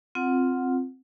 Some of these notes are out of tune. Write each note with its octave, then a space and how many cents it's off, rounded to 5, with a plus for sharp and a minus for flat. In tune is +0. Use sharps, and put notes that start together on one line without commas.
C4 +0 F4 +0 F#5 -10